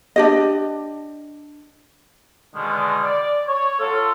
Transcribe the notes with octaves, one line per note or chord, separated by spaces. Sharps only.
D4 G4 D#5
B2 D3 D#3 G#3
D5
C#5
F#3 F4 A4